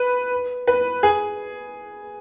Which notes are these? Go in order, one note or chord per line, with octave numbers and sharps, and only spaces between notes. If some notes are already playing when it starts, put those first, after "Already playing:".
Already playing: B4
B4
G#4